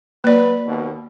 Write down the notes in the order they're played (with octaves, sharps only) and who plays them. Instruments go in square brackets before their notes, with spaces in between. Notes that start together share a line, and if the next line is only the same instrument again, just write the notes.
[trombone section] F#3 B4 [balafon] A#3 D5
[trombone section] D#2 B2